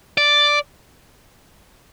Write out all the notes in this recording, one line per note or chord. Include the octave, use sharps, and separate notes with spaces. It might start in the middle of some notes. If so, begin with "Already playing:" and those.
D5